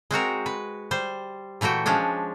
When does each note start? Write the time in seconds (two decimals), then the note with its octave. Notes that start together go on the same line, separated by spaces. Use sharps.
0.11 G#3 C4 F#4 A#4
0.46 B4
0.91 G3 C5
1.61 A#2 E3 A3 F#4 G5
1.86 F3 G#3 C#4 D4